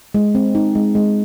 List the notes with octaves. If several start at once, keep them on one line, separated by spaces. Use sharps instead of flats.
G#3
C4
D#4
G#3
G#3